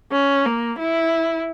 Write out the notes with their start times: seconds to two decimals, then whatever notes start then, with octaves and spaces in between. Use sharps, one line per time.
0.12 C#4
0.45 A#3
0.79 E4